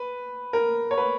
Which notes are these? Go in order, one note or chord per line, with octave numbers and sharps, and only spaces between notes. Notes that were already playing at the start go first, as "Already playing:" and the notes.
Already playing: B4
A#4
C#5
B4